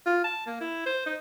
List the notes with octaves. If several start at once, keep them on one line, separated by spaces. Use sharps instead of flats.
F4
A5
A#3
E4
C5
D#4